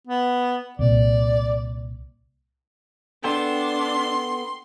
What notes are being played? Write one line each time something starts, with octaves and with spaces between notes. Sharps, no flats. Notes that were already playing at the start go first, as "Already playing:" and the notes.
B3
C2 A#2 D5
B3 D4 A4 G5 C6